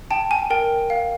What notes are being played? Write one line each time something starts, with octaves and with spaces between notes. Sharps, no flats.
G5 A5
G#5
A#4 G5
F5